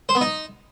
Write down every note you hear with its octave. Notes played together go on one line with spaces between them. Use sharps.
C5
B3
D#4